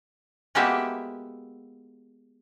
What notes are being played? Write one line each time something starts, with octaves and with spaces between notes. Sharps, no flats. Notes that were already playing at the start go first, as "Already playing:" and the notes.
G#3 A#3 B3 F#4 G4 E5